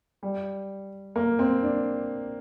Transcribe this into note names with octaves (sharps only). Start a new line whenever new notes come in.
G3
A#3
C4
D4